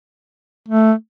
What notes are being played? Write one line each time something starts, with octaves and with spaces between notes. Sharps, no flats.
A3